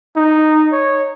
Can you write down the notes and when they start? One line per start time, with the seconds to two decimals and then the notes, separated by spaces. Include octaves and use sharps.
0.16 D#4
0.72 C#5